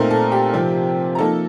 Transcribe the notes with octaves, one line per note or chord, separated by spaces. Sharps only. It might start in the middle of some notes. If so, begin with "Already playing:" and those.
Already playing: A#2 A3 C4 D#4 A#4 A#5
A4 A5
G4 G5
C3 F3 C4
A#5
F3 A#3 D#4 A4 A5